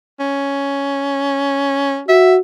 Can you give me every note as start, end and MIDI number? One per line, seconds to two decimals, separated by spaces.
0.19 2.01 61
2.08 2.39 66
2.08 2.34 76